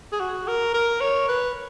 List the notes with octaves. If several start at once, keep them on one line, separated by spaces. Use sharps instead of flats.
G#4
F#4
A#4
A#4
C#5
B4